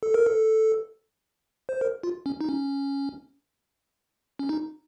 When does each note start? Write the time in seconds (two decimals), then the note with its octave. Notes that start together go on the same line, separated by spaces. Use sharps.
0.03 A4
0.14 A#4
0.26 A4
1.69 C5
1.81 A#4
2.03 F4
2.26 C#4
2.41 D#4
2.49 C#4
4.39 C#4
4.49 D#4